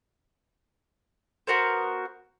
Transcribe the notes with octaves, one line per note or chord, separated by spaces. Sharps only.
B3 F#4 A#4 C5